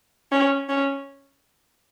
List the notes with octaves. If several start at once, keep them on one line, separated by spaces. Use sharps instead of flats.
C#4
C#4